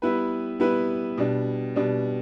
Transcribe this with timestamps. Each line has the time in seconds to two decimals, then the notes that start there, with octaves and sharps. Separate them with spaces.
0.02 G3 B3 E4 B4
0.60 G3 B3 E4 B4
1.18 B2 G3 D4
1.76 B2 G3 D4